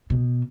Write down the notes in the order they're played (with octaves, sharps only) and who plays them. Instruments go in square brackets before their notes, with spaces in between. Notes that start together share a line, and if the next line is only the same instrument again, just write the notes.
[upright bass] B2